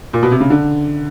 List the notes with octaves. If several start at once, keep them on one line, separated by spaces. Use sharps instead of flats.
A#2
B2
C3
C#3
D3